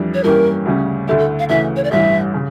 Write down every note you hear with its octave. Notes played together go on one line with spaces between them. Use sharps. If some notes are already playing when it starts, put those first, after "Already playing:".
Already playing: F2 E3 G3 D4
C#5
G2 E3 A#3 C#4 G4 A#4
D2 C#3 G3 C#4
D2 D3 A3 E4 G4
A4
F5
D2 C#3 E3 A3 E5
C#5
D5
A1 G2 E3 E5
C#3